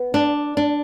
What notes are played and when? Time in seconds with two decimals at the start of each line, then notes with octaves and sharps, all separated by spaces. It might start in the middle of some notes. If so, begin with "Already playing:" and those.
Already playing: B3
0.14 D4
0.57 D4